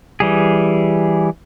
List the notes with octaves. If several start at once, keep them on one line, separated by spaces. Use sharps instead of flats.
E3 G3 G#4